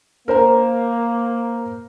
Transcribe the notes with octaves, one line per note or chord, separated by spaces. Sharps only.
A#3 A#4 C5 A#5